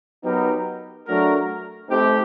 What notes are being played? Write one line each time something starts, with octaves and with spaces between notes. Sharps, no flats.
F#3 B3 D#4 G4 A#4
F#3 A3 D4 F#4 A#4
A3 C4 D#4 G4